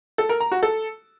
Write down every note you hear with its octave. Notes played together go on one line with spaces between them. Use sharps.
A4
A#4
A#5
F#4
A4